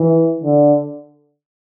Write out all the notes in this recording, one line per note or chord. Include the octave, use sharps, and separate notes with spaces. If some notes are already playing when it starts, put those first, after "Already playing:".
Already playing: E3
D3